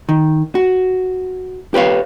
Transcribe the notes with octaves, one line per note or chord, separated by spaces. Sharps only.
D#3
F#4
G4 B4 C#5 F5